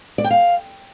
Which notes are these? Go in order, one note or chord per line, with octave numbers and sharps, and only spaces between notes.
D5
G5
F5